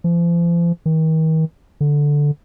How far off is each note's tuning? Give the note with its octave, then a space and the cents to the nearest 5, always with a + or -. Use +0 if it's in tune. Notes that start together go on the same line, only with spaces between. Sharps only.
F3 -40
D#3 +40
D3 -5